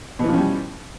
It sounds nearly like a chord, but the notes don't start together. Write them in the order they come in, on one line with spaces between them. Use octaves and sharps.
B2 E3 F3 C#4 G3